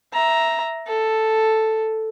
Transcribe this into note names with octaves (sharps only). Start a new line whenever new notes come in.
E5 A#5
A4